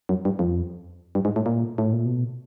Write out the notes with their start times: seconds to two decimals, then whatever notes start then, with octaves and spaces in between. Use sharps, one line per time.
0.09 F#2
0.25 G2
0.39 F2
1.15 G2
1.25 G#2
1.36 A2
1.46 A#2
1.78 A2
1.93 A#2
2.06 B2